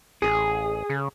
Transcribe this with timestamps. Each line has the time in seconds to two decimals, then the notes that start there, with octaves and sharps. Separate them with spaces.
0.22 A1 G#4
0.90 C#3